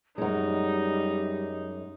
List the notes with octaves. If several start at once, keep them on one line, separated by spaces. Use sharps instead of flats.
F#2 G3 G#3 D#4